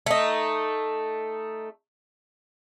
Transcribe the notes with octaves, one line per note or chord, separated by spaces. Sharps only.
A3 D#4